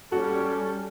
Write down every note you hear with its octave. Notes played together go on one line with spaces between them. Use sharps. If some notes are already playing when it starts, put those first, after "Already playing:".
G3 C#4 F#4 A4